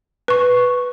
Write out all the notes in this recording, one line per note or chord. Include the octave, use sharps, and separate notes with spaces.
B4 C#6